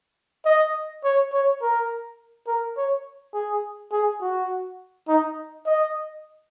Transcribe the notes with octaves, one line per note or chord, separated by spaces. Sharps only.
D#5
C#5
C#5
A#4
A#4
C#5
G#4
G#4
F#4
D#4
D#5